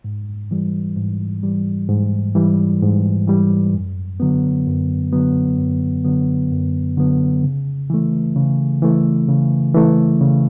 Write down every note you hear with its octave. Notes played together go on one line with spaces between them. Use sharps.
G#2
E3 G3
G#2
E3 G3
G#2
E3 G3
G#2
E3 G3
F#2
D3 F#3 B3
F#2
D3 F#3 B3
F#2
D3 F#3 B3
F#2
D3 F#3 B3
C#3
E3 A3
C#3
E3 A3
C#3
E3 A3
C#3